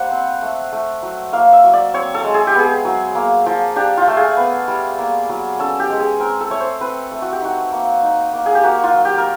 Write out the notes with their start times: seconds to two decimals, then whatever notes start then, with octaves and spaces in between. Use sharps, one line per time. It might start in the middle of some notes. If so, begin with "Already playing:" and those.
Already playing: G3 A#3 D4 C5 F#5
0.11 C4
0.42 A3
0.72 A3
1.03 F#3
1.33 A#3 F5
1.53 E5
1.64 F#3
1.73 D5
1.94 C4 C#5
2.14 A4
2.24 G#3
2.34 G#4
2.47 G4
2.55 B3 G#4
2.85 F#3
3.15 A#3
3.46 F3
3.76 D4 G4
3.97 F4
4.08 A3
4.17 G#4
4.37 B3
4.68 G3
4.98 A#3
5.29 F#3
5.59 C#4 A4
5.80 G4
5.90 G#3
6.00 G#4
6.20 C4 A#4
6.41 A4
6.50 A3 C#5
6.60 C5
6.81 C4 B4
7.11 A3
7.22 F#4
7.32 G4
7.41 D#4 F#4
7.72 A#3
8.03 D#4
8.33 A#3
8.46 G#4
8.55 G4
8.63 A#3 F#4
8.84 F4
8.94 F#3
9.05 G4
9.18 A#4